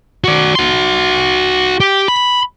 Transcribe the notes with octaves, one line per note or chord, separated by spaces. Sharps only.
F#4 D5
F#4 C6
G4
B5